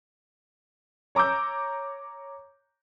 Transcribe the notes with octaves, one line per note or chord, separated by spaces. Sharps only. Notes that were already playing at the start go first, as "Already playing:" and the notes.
C#5 A#5 D6 E6 G6